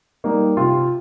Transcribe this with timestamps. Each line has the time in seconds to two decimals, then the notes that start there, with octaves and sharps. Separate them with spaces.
0.24 G3 A#3 D#4
0.57 C3 F4